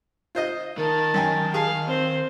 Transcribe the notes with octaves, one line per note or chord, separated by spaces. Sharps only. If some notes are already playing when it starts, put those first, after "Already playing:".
F4 C5 D#5
D#3 A#4 A5
F#2 G5 G#5
G#4 F5 A5
C4 C5